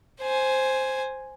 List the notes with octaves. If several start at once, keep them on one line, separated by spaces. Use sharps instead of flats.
C5 G#5